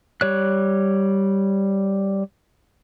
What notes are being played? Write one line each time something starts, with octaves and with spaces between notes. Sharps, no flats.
G3 C#5 F#6